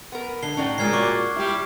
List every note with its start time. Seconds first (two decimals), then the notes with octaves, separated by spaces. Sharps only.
0.12 B3 A#4
0.43 D3 C7 G7
0.57 A2 C#4 D#4 F#4 D5 G5
0.78 A#2 C#3 G#3 G5 F6 G#6 C7
0.93 F#4 C#6 D6
1.36 G3 E4 G4